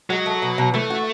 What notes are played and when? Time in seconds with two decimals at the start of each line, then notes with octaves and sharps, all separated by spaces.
0.10 F#3 G#3
0.26 A3
0.42 B2
0.58 B2
0.74 E3 A3
0.90 F#4